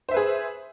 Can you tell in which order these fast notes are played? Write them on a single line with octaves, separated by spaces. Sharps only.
C5 E5 B4 G#4